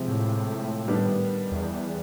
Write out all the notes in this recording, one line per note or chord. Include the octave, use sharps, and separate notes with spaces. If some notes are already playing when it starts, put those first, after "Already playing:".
Already playing: C3 F3 G#3 C4
A2
D#3 G3 B3 D4
E2